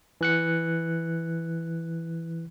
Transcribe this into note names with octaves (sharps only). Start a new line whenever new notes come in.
E3 F#6 C#7